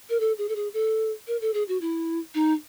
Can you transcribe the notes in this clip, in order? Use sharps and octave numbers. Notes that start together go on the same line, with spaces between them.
A#4
A4
G#4
A4
G#4
A4
A#4
A4
G#4
F#4
E4
D#4